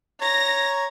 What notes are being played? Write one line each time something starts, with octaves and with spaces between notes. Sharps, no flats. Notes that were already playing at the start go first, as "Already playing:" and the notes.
C#5 A#5 A#6